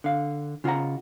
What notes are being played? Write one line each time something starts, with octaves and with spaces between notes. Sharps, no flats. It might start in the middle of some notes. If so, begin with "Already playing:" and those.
D3 F5
C#3 F4 G4 F#5 A#5